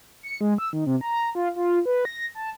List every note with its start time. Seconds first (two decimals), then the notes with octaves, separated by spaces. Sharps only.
0.23 C#7
0.41 G#3
0.58 E6
0.73 D#3
0.86 C3
1.01 A#5
1.35 F4
1.56 F4
1.86 B4
2.05 A#6
2.35 A5